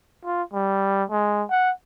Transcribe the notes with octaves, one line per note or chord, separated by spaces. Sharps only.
F4
G3
G#3
F#5